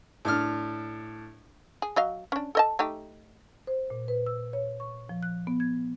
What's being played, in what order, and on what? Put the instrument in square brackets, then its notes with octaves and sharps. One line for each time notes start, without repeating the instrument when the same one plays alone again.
[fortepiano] A2 D4 F6
[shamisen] G#4
F#3 D#5 F5
C#4 D4
A4 D#5 A5
A3 D#4 G4
[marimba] C5
A#2
B4
E6
C#5
C#6
F3
F#6
B3
G#6